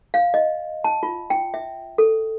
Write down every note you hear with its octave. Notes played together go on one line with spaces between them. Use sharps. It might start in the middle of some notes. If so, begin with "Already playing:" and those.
F5
D#5
A5
F4
G5
E5
A4